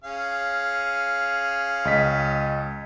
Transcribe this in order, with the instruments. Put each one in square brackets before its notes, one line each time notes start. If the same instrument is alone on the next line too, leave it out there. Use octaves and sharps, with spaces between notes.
[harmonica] C#4 G#4 F5
[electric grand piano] C#2 D#5 B6